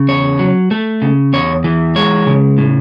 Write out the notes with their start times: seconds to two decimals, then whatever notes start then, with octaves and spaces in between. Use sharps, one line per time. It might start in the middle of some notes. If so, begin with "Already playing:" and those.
Already playing: C#3
0.09 E2 C#5
0.39 F#3
0.71 A3
1.02 C#3
1.33 E2 C#5
1.64 E3
1.96 G#3 C#5
2.27 C#3
2.58 A2